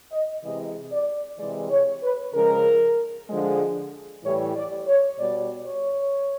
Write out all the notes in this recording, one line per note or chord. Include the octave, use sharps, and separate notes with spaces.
D#5
C3 E3 G#3 D#5
D5
C3 E3 G#3 D5
C#5
B4
C#3 F3 G#3 A#4
D3 F3 G#3
A2 E3 G3 C#5
D5
C#5
B2 G3 D5
C#5